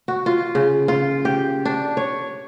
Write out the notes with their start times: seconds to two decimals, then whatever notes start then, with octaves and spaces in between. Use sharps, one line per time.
0.08 F#4
0.26 F4
0.55 C#3
0.88 F4
1.25 G4
1.65 D4
1.97 C#5